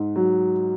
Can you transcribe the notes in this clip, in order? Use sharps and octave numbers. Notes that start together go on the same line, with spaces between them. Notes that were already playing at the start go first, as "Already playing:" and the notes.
Already playing: G#2
F#3